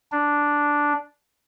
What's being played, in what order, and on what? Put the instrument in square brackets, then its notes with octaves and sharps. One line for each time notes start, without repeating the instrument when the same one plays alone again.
[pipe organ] D4